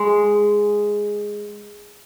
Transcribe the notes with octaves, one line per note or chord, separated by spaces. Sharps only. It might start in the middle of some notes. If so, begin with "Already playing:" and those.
Already playing: G#3